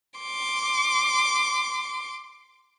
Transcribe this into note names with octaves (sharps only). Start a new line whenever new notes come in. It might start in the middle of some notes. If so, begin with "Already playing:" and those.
C6 D6